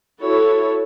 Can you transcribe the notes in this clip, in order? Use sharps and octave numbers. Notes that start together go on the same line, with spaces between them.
E4 F#4 A4 C#5